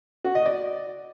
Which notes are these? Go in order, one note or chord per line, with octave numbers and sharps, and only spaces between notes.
F#4
D#5
D5